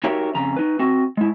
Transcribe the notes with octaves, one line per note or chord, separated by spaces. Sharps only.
D#4 F#4 G4 A#4 C#5 E5
F2 C#3 A#5
D#4 B4
C4 F#4
G#3 E4